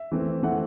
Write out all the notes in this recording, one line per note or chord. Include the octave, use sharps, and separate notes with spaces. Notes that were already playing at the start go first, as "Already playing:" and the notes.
Already playing: E5
E3 A3 C4
E3 A3 C4 F#5